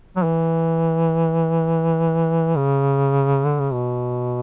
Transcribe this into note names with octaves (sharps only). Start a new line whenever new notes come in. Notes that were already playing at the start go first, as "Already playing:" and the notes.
F#3
E3
C#3
D3
C#3
B2